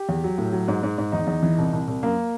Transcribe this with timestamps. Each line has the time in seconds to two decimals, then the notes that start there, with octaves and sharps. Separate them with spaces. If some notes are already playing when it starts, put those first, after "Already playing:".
Already playing: G4
0.09 E2
0.24 F#3
0.38 A2
0.53 F#3
0.68 G#2
0.83 G#2
0.98 G#2
1.12 E2 D#4
1.27 E2
1.43 E3
1.58 C2
1.73 C2
1.88 C2
2.03 F#2 A#3